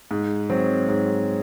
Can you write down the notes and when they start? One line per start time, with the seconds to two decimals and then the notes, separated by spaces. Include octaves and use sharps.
0.11 G#2
0.50 F#3 C4
0.89 G#2